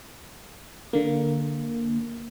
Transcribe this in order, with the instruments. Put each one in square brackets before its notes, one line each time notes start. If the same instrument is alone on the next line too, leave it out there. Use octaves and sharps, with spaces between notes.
[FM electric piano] D3 A#3